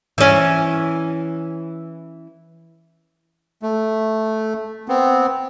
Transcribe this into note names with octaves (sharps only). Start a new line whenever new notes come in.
E3 C#4
A3
B3 C4